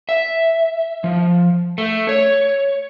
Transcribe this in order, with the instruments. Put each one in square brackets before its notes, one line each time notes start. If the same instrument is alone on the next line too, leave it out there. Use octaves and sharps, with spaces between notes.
[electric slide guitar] E5
F3
A3
C#5